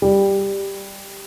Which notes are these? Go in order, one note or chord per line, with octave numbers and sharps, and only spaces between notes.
G3